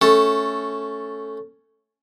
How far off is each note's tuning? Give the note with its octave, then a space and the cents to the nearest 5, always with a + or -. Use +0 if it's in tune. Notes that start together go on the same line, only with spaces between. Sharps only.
A3 -5 C#4 +0 A4 +0